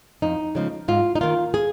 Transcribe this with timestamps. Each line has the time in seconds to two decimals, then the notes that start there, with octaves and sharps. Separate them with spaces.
0.22 F2 D#4
0.55 C#3 F3 G#3
0.88 G#2 F4
1.15 D#4
1.21 D#3 A#3 F4
1.54 G#4